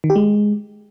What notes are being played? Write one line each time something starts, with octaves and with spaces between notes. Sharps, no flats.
D#3
G4
G#3